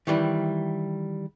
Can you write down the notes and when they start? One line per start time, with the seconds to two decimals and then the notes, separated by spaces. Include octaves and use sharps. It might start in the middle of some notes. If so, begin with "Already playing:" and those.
0.07 D#3 E3 G3 E4